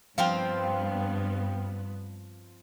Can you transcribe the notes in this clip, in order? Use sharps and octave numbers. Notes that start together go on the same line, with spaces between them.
G2 F3 B3 C4 F4 F5 G5